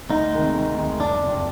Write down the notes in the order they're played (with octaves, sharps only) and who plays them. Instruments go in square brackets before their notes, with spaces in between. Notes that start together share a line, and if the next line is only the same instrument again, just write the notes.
[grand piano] D2 [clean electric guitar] D#4
[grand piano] C3 D#3 G#3
D2
C3 D#3 G#3
[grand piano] F#1 [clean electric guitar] D4
[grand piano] F2 C3